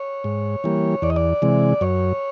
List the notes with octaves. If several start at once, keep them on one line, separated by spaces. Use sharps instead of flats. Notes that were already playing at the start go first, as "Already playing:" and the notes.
Already playing: C#5
G#2
E3 G3 A#3
E2 D5
D#5
D5
C3 E3 G#3
F#2 C#5